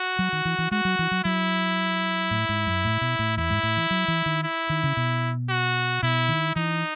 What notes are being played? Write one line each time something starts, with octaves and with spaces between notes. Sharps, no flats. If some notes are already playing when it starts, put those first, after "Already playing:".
Already playing: F#4
F#3
D#3
E3
E3
G#3 F#4
F#3
E3
F#3
F#3 E4
A2
G#2
F#2
A2
B2
A2
E2 E4
G#2
A2
E3
F#3
E3
D#3
E4
D#3
C#3
B2
F#4
B2 E4
D#3
E3 D#4